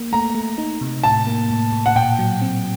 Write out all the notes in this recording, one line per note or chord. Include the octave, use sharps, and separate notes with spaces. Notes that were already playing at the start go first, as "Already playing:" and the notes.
Already playing: A#3
A3 A#5
A3
D#4
C3
A2 A5
A#3
A2
A2
F#5
A#2 G5
F#3
C4